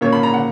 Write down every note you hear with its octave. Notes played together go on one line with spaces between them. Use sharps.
A#2 A#3 C#4 C#5
B5
A#5
F#5